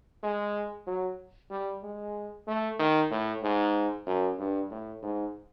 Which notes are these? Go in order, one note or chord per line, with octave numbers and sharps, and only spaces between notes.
G#3
F#3
G3
G#3
A3
D#3
A2
G#2
F#2
G2
A2
G#2